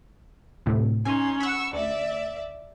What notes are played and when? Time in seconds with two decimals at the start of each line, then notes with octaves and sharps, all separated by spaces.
0.66 D2 A2 C3
1.05 C#4 D#4 G#5 C6
1.40 F#5 B5 C#6 E6
1.73 D2 D5 E5